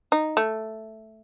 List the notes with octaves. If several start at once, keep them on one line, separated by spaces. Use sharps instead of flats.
D#4
A3